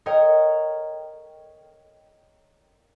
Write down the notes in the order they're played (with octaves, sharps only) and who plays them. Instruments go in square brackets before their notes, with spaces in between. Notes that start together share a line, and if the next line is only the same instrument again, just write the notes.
[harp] A#4 C#5 D#5 F5 G5 A#5